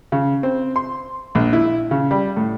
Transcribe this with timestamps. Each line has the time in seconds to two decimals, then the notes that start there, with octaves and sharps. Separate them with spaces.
0.12 C#3
0.43 C4
0.76 C6
1.35 A#1
1.53 E4
1.91 C#3
2.11 G3
2.37 A2